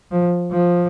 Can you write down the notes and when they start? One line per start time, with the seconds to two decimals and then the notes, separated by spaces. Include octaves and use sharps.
0.11 F3
0.52 F3